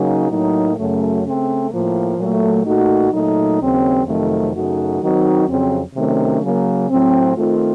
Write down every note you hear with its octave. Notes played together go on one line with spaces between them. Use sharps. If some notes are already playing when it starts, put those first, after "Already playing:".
Already playing: C#3 F#3 A#3 D#4 F#4
A2 F#3 A#3 D#4
F#2 C#3 F#3 A3
C#3 A3 C4
A2 F3 A#3
A#2 F#3 A3
A#2 A3 D#4 F#4
A#2 F#3 A3 D#4
D#2 C#3 F#3 C4
F2 C3 D#3 F#3 A3
F#2 C#3 A3 D#4 F#4
D#3 F#3 C4 D#4 F#4
F2 C#3 F#3 C4
C3 D#3 F#3 A3 C#4
C#3 F#3 A#3
A2 F#3 C4
D#3 A3 C4 F4